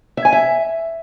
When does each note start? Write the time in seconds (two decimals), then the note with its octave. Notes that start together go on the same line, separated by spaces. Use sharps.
0.17 E5
0.25 G#5
0.33 E5